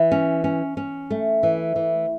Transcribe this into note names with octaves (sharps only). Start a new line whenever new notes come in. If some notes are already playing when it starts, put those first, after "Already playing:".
Already playing: E3
C#4
C#4
C#4
A3
E3
E3